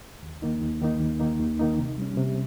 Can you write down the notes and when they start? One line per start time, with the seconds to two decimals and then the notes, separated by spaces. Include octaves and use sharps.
0.23 D#2
0.42 D#3 A#3 D#4
0.62 D#2
0.81 D#3 A#3 D#4
1.00 D#2
1.19 D#3 A#3 D#4
1.40 D#2
1.59 D#3 A#3 D#4
1.79 C3
1.98 G3 C#4
2.17 C3